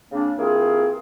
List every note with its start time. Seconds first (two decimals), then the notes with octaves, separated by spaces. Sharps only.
0.11 C#3 A#3 C4 D4
0.38 E3 A#3 C4 F4 G4 G#4